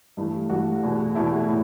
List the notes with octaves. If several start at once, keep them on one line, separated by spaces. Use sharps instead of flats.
G2 E3 A3
G2 E3 A3 F#4
E2 B2 A3
E2 B2 A3 E4
A2